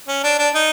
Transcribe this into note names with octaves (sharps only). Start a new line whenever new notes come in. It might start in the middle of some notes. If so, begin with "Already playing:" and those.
C#4
D4
D4
D#4